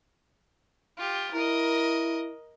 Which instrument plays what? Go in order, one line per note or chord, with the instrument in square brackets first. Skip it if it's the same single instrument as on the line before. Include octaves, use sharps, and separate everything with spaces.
[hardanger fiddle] F4 G4
[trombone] E4 [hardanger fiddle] A#4 D#5